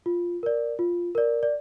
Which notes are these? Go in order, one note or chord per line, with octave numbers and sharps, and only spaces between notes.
F4
A#4 D5
F4
A#4 D5
D5